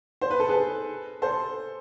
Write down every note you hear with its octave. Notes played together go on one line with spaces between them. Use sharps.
C5
B4
A4
G#4 B4
A4 C5